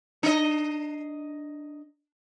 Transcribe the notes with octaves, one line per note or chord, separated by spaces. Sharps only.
D4 D#5